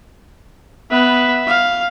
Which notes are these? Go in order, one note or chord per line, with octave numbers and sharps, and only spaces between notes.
B3 B4 E5
F5